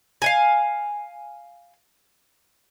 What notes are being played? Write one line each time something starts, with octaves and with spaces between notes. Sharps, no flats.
F5 F#5 G#5